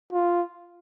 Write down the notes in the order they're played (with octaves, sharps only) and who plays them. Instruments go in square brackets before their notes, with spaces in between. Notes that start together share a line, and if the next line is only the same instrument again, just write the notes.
[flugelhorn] F4